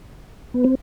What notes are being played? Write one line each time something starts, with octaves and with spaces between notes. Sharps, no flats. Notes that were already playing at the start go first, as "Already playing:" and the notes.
B3
C4